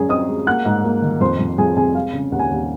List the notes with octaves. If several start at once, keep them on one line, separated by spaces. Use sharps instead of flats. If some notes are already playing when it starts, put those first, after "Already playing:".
Already playing: F#2 G#3 G#4 G#5
C4 D#5 D#6
G#3
A#3 F#5 F#6
G#2
A#3
D#3
F2 C5 C6
F2
F2 G#4 G#5
C3 G#4 G#5
G#3 F5
C#3
D#2 F#5
G#5
D#2 F#5